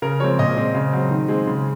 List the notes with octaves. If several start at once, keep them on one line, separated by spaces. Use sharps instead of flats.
C#3 A#4
F3 G#3 C4 C#5
A#2 D#5
G#3 C4
C#3
F#3 C4
D#3
G#3 C4
C#3